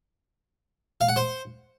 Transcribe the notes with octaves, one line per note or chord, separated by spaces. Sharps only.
F5
F#5
C5